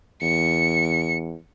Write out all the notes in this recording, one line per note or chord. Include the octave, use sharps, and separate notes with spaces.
E2 C#7